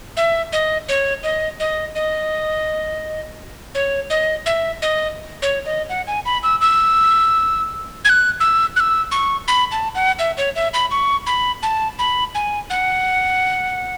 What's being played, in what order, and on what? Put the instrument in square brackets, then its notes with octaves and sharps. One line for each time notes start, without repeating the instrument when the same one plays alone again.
[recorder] E5
D#5
C#5
D#5
D#5
D#5
C#5
D#5
E5
D#5
C#5
D#5
F#5
G#5
B5
E6
E6
G#6
F#6
E6
F#6
E6
C#6
B5
A5
F#5
E5
C#5
E5
B5
C#6
B5
A5
B5
G#5
F#5